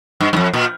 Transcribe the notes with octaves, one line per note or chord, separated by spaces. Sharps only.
G2
G2
F2
A#2